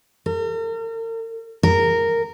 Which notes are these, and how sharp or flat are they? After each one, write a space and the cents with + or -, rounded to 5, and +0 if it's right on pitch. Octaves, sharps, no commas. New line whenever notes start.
A#4 -40
A#4 -10